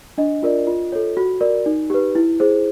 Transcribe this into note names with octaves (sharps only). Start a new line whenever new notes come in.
D4 D#5
F4 A#4 D5
F4
A4 C#5
F#4
A#4 D5
D#4
G4 B4
E4
G#4 C5